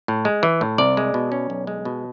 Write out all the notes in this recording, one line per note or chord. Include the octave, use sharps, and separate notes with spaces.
A2
G#3
E3
A2
C2 D5
G#3
B2
C#4
B1
G#3
B2